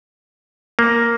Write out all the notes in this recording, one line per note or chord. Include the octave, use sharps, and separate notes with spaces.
A#3